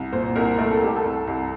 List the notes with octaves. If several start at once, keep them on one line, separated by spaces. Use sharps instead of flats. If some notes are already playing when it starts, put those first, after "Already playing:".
Already playing: C2
A#2 C5
C2 A#4
A3 A#4
A4
C2 G4
A4
C2
C2